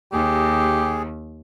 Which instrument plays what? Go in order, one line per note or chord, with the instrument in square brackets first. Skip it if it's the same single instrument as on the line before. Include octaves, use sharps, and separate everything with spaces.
[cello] D#2 [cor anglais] G4 [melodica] G#4